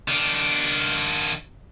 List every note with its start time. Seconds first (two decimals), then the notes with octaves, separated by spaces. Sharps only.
0.08 D#3 D4